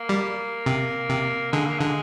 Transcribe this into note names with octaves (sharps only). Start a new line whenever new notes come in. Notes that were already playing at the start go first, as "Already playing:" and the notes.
Already playing: A#3
G3
C3
C3
D3 G#3
A#3
D3 G#3